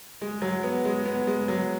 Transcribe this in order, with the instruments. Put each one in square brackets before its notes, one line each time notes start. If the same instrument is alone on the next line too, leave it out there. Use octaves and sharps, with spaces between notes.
[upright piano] G#3
F#3
B3
G#3
B3
G#3
F#3